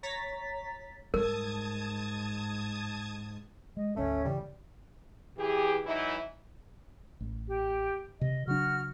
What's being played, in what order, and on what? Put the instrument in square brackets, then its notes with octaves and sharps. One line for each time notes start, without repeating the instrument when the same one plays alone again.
[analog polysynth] C#5 A#5 A6 B6
[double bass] G#2 [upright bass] G3 [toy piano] A#4 [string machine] A5 D#6 G#6
[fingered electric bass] G#3 [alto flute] D#5
[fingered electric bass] G#1 D2 [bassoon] A3 [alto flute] C#4
[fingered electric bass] G2 C#3 E3 [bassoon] G3
[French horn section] E3 G4 G#4
E3 F#3 D#4 E4
[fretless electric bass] A1
[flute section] G4
[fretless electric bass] C3 [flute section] D#5
[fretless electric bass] C#3 F#3 D4 [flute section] F#4 F6